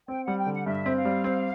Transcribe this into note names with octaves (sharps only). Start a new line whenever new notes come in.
C4 G5
G3 F#5
G5
D3
F#5
G2 E5
C4
F5
G3
C4